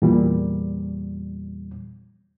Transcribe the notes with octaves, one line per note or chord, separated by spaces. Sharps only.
E2 A#2 G3